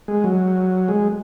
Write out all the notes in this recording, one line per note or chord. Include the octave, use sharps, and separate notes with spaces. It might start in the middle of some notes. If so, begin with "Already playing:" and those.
G#3
F#3
G#3